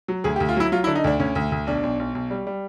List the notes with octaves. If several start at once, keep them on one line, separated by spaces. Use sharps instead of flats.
F#3
D2 G#4
G4
D2
F4
F#3 E4
F#3 F4
E4
D3
D#4
D2 D4
D2 C#4
D2
D2
B1 D4
B1
B1
B1
G3
G3